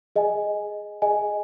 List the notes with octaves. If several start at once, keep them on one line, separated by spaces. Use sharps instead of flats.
G#4 D#5 G#5
G#4 D#5 G#5